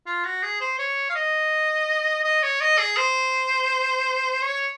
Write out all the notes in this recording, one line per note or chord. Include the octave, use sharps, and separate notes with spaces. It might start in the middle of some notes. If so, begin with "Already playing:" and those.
F4
F#4
G#4
C5
C#5
F5
D#5
D#5
C#5
D#5
G#4
C5
C#5